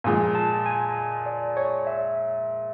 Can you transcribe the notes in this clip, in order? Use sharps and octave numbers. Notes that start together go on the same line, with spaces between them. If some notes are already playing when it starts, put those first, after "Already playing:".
A#2 F3 G#3 G#5
A5
G#5
D5
C#5
E5